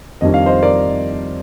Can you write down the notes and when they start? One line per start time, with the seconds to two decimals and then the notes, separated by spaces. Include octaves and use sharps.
0.21 F2 D#3 G3 D4 D#5
0.34 F5
0.46 C5 D#5
0.63 A#4 D5